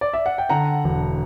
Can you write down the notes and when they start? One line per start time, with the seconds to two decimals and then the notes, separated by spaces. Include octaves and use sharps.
0.01 D5
0.13 E5
0.26 F#5
0.38 G5
0.49 D3 F#5 A#5
0.84 E1